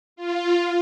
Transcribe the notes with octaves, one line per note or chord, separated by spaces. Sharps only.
F4